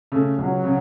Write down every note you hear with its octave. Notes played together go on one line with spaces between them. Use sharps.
C#3 A3
C#2 F#3
C#3